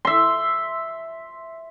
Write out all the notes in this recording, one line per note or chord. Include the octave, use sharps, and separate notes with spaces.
E5 C6